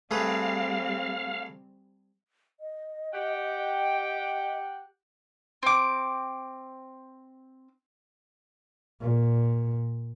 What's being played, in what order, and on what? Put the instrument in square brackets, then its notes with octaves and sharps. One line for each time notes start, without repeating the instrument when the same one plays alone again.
[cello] G3 C4 [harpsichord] A3 G#4 B4 [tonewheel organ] F5
[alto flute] D#5
[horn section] G4 F#5 G5
[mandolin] C4 D6
[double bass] A#2